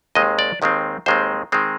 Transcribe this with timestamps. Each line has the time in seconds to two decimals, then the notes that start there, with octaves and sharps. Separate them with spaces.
0.15 D#2 D#3 G#3 C4 D#5
0.39 D5
0.62 D#2 D#3 G#3 C4
1.06 D#2 D#3 G#3 C4 C5
1.52 D#3 G#3 C4